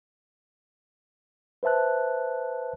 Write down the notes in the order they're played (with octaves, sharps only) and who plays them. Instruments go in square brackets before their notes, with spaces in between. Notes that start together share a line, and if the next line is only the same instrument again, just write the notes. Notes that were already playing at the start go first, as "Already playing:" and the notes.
[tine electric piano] B4 C5 E5 A5 F#6